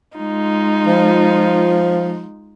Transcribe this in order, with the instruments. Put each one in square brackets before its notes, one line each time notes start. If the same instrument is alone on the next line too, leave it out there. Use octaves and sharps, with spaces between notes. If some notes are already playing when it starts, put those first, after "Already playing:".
[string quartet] G#3 D#4 F4
[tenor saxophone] F3